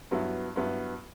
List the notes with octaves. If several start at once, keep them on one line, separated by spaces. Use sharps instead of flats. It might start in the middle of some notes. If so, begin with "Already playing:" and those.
G2 F#3 B3 E4
G2 F#3 B3 E4